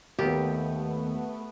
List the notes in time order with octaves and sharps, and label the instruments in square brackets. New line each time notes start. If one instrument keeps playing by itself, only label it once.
[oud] D#2 [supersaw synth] A3 B3 [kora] G4